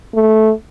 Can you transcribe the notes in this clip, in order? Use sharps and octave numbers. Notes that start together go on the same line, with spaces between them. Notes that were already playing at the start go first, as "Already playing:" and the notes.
A3